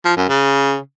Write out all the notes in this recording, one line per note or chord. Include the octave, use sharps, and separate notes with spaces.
F3
F#2
C#3